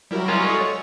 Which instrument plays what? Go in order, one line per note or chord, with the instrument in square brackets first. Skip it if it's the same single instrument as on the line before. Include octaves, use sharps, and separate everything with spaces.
[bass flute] F#3 [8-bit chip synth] G3 E4 A#4
[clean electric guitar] G#3 C#4 F4
[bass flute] A4 [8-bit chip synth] C#6 D#6
[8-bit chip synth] C#5